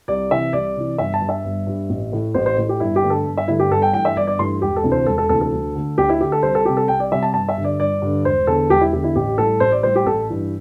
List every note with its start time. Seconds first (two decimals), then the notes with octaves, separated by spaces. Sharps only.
0.08 C2 D5
0.30 C3 E3 E5
0.53 C2 D5
0.76 C3 E3
0.98 G1 E5
1.14 A5
1.21 G2 G3
1.29 E5
1.45 G1
1.67 G2 G3
1.90 A1
2.12 A2 A3
2.34 A1 C5
2.46 C5
2.57 A2 A3
2.69 G4
2.80 G1 E4
2.96 G4
3.03 G2 D3 A3
3.10 A4
3.26 G1
3.38 E5
3.48 G2 D3 A3 E4
3.60 G4
3.70 G1 A4
3.82 G5
3.93 G2 E3 A3 G5
4.05 E5
4.16 G1 D5
4.27 D5
4.39 G2 E3 A3 C6
4.62 E1 G4
4.76 A4
4.84 D2 C3 E3 A3
4.92 C5
5.06 E1 A4
5.18 A4
5.29 D2 C3 E3 A3 A4
5.41 A4
5.53 D2
5.75 D3 A3
5.98 D2 G4
6.09 E4
6.21 D3 A3 G4
6.32 A4
6.43 C2 C5
6.55 A4
6.65 C3 G3 G4
6.77 A4
6.88 C2 G5
7.00 D5
7.12 C3 G3 E5
7.23 A5
7.33 G1 A5
7.49 E5
7.57 G2 D3
7.64 D5
7.79 G1 D5
8.02 G2 D3
8.25 E1 C5
8.47 E2 D3 A4
8.70 E1 G4
8.81 E4
8.93 E2 D3 G4
9.04 E4
9.15 A1 G4
9.38 A2 G3 A4
9.60 A1 C5
9.72 D5
9.83 A2 G3 C5
9.96 G4
10.06 A1 A4
10.29 G2 E3